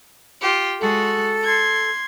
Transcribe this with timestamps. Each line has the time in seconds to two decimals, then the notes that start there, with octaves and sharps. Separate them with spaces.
0.40 F4 G4
0.80 G#3 F#4 A4
1.45 C6 G#6